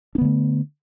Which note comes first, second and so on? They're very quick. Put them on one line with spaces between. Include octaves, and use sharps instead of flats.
D4 B3 D3 A3